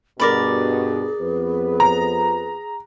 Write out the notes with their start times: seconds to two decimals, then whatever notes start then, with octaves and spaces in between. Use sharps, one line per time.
0.20 G2 B2 G#4 A#4 D5 B5
1.20 F2 B3 B4
1.80 A#5